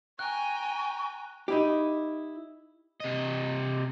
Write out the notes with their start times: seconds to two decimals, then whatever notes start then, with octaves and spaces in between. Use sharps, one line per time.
0.19 G5 G#5 A#5 C#6 F#6
1.48 D#4 E4 G4
3.00 C3 D#5